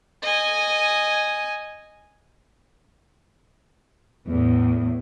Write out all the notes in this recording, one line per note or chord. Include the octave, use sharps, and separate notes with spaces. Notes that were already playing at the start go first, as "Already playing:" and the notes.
D#5 G#5
E2 A2